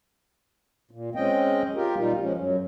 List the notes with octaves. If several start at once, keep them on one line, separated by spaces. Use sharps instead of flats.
A#2
G#3 C4 C#4 D#5 G5
F4 G4 A#4
A#2 G3 D#4 F4
F3 G#3 C#4
F#2 F#3